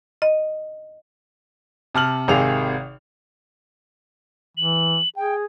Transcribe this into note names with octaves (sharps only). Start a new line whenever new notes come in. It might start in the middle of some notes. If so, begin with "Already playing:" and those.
D#5
C3 A5 F6 F#7
G#1 C3 D#3 G#4 F5 F7
E3 F#7
G#4 G5